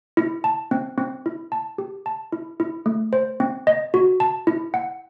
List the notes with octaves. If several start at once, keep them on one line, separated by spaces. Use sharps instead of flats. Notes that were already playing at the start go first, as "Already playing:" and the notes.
E4
A5
C4
C4
E4
A5
G4
A5
E4
E4
A3
C5
C4
D#5
F#4
A5
E4
F#5